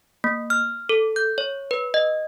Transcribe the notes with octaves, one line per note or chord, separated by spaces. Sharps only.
A#3
F6
A4
G6
C#5
B4
D#5